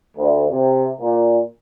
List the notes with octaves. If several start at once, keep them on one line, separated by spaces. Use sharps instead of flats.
D2
C3
A#2